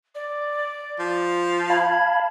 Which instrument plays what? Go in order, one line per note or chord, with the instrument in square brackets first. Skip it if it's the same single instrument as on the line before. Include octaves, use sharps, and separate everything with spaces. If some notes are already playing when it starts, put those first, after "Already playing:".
[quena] D5
[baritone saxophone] F3
[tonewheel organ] F5 A5 B5 [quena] G#6